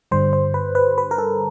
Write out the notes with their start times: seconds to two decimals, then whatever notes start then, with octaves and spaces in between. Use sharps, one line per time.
0.11 G2 D3 G3 C5
0.33 C5
0.54 B4
0.75 B4
0.98 B4
1.11 A#4
1.18 A4